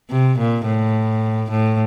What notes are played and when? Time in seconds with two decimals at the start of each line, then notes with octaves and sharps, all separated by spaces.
0.10 C3
0.38 A#2
0.66 A2
1.50 A2